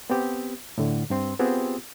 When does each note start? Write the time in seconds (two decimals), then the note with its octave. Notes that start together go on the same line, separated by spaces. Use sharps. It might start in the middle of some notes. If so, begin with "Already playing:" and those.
0.10 B3 C4 G4
0.78 A2 D3
1.10 G2 C4 C6
1.39 B3 C4 F4 G4 G#4